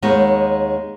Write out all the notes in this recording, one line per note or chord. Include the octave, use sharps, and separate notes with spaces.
D#2 G#3 B3 D#4 C#5